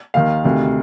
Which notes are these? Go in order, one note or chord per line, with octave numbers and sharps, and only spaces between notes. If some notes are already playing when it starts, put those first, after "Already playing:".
D#2 D#3 F5
D2 C3 D#3